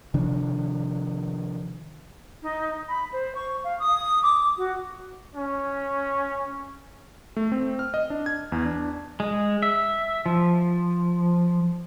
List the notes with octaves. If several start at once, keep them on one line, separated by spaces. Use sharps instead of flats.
C3 D#3 F3 D4
D#4
B5
C5
C#6
F5
D#6
D6
F#4
C#4
A3
C4
F6
D#5
D4
G#6
E2
D4
G#3
E5
F3